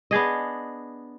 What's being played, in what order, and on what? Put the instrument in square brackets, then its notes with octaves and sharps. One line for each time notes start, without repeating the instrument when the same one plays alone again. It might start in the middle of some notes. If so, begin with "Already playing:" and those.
[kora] B3 D4 G#4 D#5